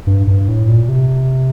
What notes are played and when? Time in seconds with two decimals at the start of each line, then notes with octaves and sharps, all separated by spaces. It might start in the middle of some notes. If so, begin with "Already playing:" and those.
0.07 G2
0.27 G2
0.48 A2
0.68 A#2
0.89 C3